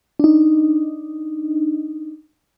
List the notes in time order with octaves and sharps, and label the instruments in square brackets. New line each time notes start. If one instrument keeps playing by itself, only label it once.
[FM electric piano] D4 D#4